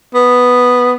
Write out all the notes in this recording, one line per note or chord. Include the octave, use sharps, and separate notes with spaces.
B3